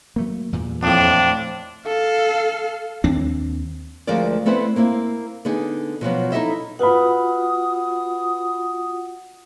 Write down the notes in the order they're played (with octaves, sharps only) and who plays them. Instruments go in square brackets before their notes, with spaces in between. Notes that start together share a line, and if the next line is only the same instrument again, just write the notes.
[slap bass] F#3 A3 A#3
E2 G2 A#2
[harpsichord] F2 A2 [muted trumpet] D4
[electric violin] A4 F5
[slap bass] D#2 C4 D4
[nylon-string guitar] D2 F3 G#3 A#4 D5
A3 B3 C4 E4 B4 C5
A#3 C4 E4
D3 B3 D#4 G#4
B2 F3 F#3 B3
D#4 E4 G4 A4 D#5 E5
[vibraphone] F4 F#4 F#5 [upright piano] B4 B5 [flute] D#6